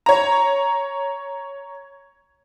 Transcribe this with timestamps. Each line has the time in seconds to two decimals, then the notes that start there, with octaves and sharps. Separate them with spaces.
0.06 C#5 A#5